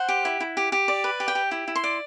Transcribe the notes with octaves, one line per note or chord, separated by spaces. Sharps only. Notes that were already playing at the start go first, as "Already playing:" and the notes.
Already playing: C5 F#5
G4
E4
E4
G4
G4
D5
B4
G4
G5
G4
E4
E4
C6
D5